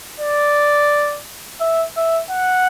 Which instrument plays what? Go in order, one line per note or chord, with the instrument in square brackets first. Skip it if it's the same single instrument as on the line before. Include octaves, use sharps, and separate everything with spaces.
[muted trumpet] D5
E5
E5
F#5